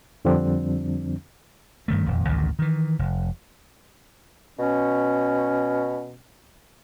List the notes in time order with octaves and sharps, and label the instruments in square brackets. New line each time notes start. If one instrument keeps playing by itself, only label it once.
[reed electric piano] F2 D3 F3 G3 C4 D4
[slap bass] G2 D#3 A3
D#1 F2
A1 D2 G2 D#3
D#3 E3
F1
[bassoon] B2 [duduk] C#4